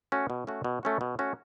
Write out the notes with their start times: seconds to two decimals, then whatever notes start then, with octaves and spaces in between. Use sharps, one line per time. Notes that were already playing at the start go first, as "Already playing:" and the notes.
0.12 A3 C#4 F#4
0.30 B2
0.47 A3 C#4 F#4
0.64 B2
0.83 A3 C#4 F#4
1.01 B2
1.19 A3 C#4 F#4